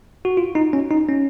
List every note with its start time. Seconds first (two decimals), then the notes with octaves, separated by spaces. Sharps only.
0.25 F#4
0.37 F4
0.55 D#4
0.73 C#4
0.91 D#4
1.09 C#4